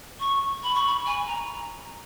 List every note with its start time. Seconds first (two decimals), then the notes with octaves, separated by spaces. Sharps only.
0.20 C#6
0.63 B5
0.75 C#6
0.87 B5
1.06 G#5
1.27 A#5